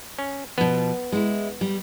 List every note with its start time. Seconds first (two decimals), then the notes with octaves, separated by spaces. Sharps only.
0.18 C#4
0.58 B2 F3 B3
1.12 G#3 E4
1.61 G3